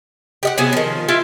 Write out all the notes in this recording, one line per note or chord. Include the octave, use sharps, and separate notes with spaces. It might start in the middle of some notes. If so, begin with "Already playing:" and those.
G4 D#5 F#5
C3 F#3 B3 G#4
D#3 F3
E4 F4 E5 F5